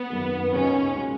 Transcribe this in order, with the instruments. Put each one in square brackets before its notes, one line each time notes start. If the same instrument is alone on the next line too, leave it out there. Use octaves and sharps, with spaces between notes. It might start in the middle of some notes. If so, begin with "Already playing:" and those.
Already playing: [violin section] B3
[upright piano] G#1 F#2 D#3 A#3
[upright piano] C#2 B2 A#3 D#4 [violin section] C#4
[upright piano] C#3 G#3